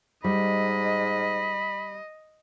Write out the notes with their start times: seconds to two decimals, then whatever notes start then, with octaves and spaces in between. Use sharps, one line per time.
0.24 G#2 G3 D#5 B5